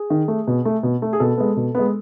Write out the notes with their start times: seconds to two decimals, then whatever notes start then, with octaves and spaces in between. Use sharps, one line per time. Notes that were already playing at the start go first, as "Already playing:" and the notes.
Already playing: G#4
0.10 D#3
0.28 A3
0.47 B2
0.65 A3
0.83 B2
1.02 A3
1.13 G#4
1.20 B2 A4
1.37 G#3 B3
1.57 B2
1.75 G#3 B3